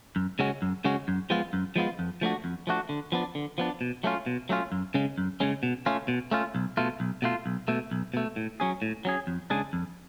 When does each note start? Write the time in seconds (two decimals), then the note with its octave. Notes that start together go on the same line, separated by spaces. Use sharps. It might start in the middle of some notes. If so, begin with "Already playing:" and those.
0.16 F#2
0.39 C#3 G#3 C#4 F#4
0.62 F#2
0.84 C#3 G#3 C#4 F#4
1.08 F#2
1.30 F3 G#3 B3 F4
1.53 F#2
1.76 F3 G#3 B3 F4
1.99 F2
2.21 F3 A3 D4 F#4
2.44 F2
2.67 F3 A3 D4 F#4
2.89 D3
3.12 F3 B3 D4
3.35 D3
3.58 F3 B3 D4
3.81 B2
4.03 F#3 A3 C#4 F4
4.26 B2
4.49 F#3 A3 C#4 F4
4.72 F#2
4.94 C#3 G#3 C#4
5.18 F#2
5.40 C#3 G#3 C#4
5.63 B2
5.86 A3 C#4 F4
6.08 B2
6.31 A3 C#4 F4
6.55 B1
6.77 B2 A3 F4
7.00 B1
7.22 B2 A3 F4
7.46 B1
7.68 B2 A3
7.91 B1
8.14 B2 A3
8.36 A2
8.60 F#3 C#4 G#4
8.82 A2
9.05 F#3 C#4 G#4
9.27 F2
9.50 C#3 G#3 D4 G#4
9.73 F2